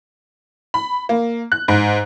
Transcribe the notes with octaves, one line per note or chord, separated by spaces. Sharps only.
B5
A#3
F#6
G#2